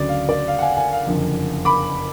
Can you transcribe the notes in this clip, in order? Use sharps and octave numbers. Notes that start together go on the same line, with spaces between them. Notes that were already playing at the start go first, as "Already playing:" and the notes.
Already playing: D2 C#3 F#3 D5
F5
D5
F5
F#5
F5 G#5
F5 G#5
F5
F#1 F2 D3
B5 D6